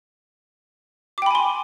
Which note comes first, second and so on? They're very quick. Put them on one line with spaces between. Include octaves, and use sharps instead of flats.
D6 G5 B5 G#5 C6